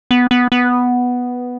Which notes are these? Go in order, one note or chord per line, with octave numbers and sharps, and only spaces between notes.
B3
B3
B3